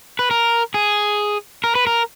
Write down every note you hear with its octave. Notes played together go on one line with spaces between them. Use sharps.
B4
A#4
G#4
A#4
B4
A#4